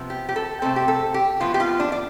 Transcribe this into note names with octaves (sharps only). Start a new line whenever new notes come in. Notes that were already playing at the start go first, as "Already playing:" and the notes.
Already playing: C3 F3 B3
G4
G4
A4
C3 E3 A3 C4 A4
G4
A4
G4
A2 F3 B3 F4
G4
F4
D4
D5